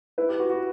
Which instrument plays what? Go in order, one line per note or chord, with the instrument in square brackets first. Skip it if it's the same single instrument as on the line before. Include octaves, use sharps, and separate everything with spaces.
[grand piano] E4 [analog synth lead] B4
[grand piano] G4
F#4
F#4